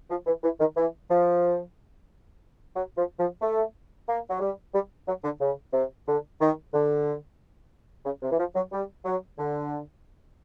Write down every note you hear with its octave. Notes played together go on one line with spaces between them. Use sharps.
F3
E3
E3
D#3
E3
F3
F#3
F3
F3
A3
A#3
F#3
G3
G3
F#3
D3
C#3
C3
D3
D#3
D3
C#3
C3
E3
F3
F#3
G3
F#3
D3